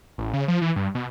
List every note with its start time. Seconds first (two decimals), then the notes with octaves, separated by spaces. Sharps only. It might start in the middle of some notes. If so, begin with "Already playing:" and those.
0.18 A1
0.34 C#3
0.48 F3
0.62 E3
0.76 G2
0.95 B2